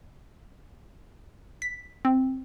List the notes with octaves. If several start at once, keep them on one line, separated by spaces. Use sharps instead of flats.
B6
C4